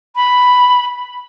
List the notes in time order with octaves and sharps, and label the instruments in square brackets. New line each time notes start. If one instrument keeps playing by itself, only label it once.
[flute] B5